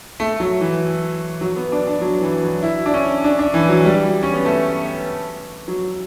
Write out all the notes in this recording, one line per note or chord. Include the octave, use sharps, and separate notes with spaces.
A3
F#3
E3
F#3
B3
D4
D4
F#3
E3
F#3
E4
D4
C#4
D4
D4
E3
F#3
G3
C#4
B3
A3
F#3